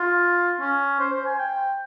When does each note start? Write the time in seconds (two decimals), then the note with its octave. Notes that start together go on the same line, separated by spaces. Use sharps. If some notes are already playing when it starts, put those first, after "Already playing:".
Already playing: F4
0.60 C#4
1.00 C5
1.13 C5
1.25 G#5
1.39 G5